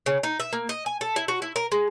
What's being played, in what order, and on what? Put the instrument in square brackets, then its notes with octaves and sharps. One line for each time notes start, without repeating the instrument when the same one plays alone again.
[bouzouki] C#3
D#4
E5
A#3
D#5
G#5
A4
E4
F#4
E4
A#4
G#3